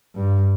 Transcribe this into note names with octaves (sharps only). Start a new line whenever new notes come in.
G2